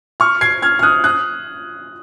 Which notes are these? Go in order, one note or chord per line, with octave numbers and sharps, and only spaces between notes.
C#6 F6
G#6 C7
F6 G#6
F6
D#6 F#6
D#6 F#6